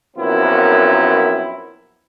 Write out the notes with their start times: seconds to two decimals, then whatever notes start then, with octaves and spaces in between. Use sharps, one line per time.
0.16 A#1 F#2 B3 C4 E4 A#4